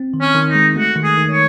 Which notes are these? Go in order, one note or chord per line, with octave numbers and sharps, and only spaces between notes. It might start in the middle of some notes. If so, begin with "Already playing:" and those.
Already playing: C4
D#3
C#4
D#3
D#4
G#3
A3 F#4
D#3
G#4
D#3
C#5